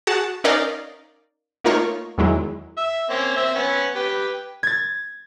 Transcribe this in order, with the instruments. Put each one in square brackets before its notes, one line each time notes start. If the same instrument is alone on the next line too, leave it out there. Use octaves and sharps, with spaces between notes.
[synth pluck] F#4 G#4 F#5 A5
C#4 D#4 A#4 D5 D#5 F5
A3 A#3 D#4 F4 A#4 C#5
E2 D#3 F#3 G#3 E4
[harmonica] E5
A#3 C4 C#4
C4 E5
B3 C#4
G4 B4
[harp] G#6 A6